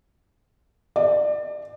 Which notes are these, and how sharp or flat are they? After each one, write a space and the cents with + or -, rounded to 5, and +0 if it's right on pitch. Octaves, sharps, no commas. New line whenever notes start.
D5 +30